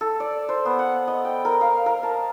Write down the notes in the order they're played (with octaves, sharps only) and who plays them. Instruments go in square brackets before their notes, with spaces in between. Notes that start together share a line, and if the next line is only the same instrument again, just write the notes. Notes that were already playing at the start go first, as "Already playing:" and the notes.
[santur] A4
D5
C5
B3
F#5
D#5
G5
A#4
F5
A#4
A5